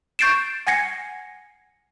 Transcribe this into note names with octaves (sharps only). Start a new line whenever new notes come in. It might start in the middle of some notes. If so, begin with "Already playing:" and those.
C#6 G6 A6 C7 D7 E7
F#5 G#5 G#6 A#6 C7 C#7